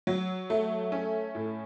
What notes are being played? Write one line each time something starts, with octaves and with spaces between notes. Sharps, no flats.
F#3
A3
C#4
A2